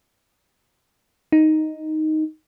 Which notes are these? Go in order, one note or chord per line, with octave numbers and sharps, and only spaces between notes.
D#4